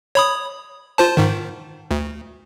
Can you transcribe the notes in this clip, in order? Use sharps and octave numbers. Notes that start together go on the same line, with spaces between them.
C#5 B5 D#6
F4 C5 A5
G#2 D#3
D2